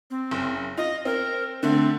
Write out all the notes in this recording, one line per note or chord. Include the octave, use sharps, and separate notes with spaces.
C4
F#1
F4 D#5
C4 A#4
D3 A3 C4